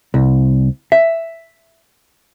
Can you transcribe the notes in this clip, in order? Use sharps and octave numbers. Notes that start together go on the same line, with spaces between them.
C2
E5